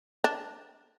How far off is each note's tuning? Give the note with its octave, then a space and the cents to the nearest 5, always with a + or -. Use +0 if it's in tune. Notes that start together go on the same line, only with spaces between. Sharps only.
D4 -5